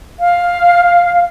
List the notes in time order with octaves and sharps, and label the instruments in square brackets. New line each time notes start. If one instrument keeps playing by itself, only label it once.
[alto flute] F5